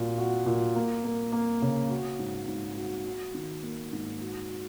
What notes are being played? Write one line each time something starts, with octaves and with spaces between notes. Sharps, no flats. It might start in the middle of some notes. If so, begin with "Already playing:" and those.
Already playing: A#2 F#4
F#4
A#2
A#3
A#3
A#3
C#3
F#4
G#2
G#2
F#4
F#4
D#3
A#3
G#2
F#4
F#4